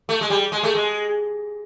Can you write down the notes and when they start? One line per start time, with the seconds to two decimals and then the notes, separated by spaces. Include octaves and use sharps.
0.09 A3
0.21 G#3
0.30 G3
0.52 G#3
0.63 A3
0.75 G#3